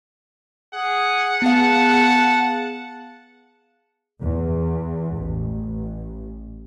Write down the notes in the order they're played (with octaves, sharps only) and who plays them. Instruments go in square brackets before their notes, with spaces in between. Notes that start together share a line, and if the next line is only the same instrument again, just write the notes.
[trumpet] G#4 [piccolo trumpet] F#5
[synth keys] B3 G#4 F5 [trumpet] A5
[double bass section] E2
A1